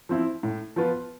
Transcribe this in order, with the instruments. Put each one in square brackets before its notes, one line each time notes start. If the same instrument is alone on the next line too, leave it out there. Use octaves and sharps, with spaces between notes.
[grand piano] F3 C4 E4
A2
F3 B3 F4 B4